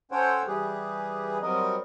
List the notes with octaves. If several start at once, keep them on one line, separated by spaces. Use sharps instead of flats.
C#4 A4 C5 C#5 F#5 G5
E3 G3 G4 G#4 B4
F#3 G3 C4 A#4 D#5